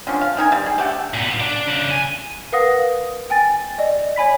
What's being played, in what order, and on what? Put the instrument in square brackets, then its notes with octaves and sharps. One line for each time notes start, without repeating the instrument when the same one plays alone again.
[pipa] D3 F3 C#4
F5
D#3 D#4 E4 G#5
G3
G#4
A3 G4 F#5
[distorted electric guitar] A#2 B3
D4 D5
C#3 D4
G#5
[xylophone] A#4 B4 F5 F#5 D#6 A#6
G5 G#5 A6
D5 D#5
C#5 G#5 B5 B6